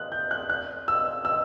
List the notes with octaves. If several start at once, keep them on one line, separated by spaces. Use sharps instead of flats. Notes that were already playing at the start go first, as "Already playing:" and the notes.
Already playing: F#6
G6
F#6
F#6
E6
E6